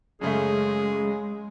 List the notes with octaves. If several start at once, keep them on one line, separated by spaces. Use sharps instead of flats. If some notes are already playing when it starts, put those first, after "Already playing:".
F#2 C#3 G#3 A3 G#4